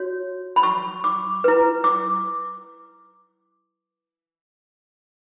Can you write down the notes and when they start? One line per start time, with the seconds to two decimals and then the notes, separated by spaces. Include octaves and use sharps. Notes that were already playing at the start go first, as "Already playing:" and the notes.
Already playing: F#4 C#5
0.56 B5
0.63 C#6
1.04 D6
1.44 E4 B4
1.84 D6